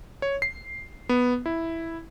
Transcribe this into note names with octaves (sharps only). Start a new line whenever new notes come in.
C#5
C7
B3
E4